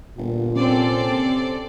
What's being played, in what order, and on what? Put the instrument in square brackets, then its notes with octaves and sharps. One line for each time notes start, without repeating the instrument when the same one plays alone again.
[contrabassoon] G1 [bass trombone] A#2
[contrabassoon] C3 [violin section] C4 A4 D5 [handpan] C#4